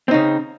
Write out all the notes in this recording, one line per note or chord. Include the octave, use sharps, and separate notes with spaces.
C#3 C4 D#4